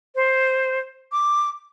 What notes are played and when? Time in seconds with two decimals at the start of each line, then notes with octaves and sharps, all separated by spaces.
0.15 C5
1.12 D6